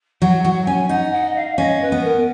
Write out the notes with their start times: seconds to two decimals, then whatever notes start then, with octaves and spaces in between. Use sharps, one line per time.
0.21 F#3 F#5
0.44 F#3 F#5
0.66 C#4 G#5
0.89 D#4 F#5
1.12 F#5
1.26 D#5
1.36 F5
1.58 C#4 D#5
1.81 B4
1.92 B3
2.04 A#4